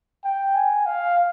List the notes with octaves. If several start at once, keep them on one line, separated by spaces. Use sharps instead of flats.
G5
G#5
F5